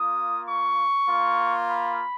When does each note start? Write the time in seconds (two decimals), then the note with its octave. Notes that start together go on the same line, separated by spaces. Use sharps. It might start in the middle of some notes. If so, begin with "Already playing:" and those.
Already playing: A#3 F4 D#6
0.47 C#6
1.09 A#3 F4
1.68 B5